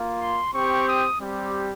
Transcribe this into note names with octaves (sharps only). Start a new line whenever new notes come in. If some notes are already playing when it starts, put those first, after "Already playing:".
Already playing: A#3 F4
C6
C4 G4 C#6
D#6
G3 C4 G4